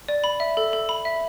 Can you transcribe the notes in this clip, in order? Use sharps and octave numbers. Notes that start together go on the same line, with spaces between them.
D5
B5
E5
A4
A4
B5
E5